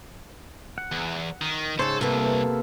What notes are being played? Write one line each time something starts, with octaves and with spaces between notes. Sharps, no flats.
F#5
E2
D#3
G#2 C#3 A4 C5 C#5
C2 C3 A#3 B3 A4